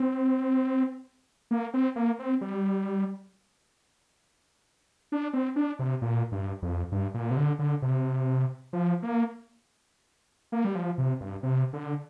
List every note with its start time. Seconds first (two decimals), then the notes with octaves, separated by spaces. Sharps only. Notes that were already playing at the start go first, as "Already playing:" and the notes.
Already playing: C4
1.51 A#3
1.74 C4
1.96 A#3
2.19 C4
2.41 G3
5.12 D4
5.34 C4
5.56 D4
5.79 C3
6.02 A#2
6.32 G2
6.62 F2
6.92 G2
7.14 A#2
7.31 C3
7.37 D3
7.59 D3
7.82 C3
8.73 F3
9.02 A#3
10.52 A#3
10.65 G3
10.75 F3
10.98 C3
11.21 G2
11.43 C3
11.73 D3